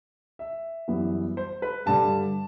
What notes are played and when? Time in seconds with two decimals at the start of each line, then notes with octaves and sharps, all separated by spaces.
0.39 E5
0.88 F#2 E3 G3 B3
1.37 C5
1.62 B4
1.86 G2 D3 G3 A5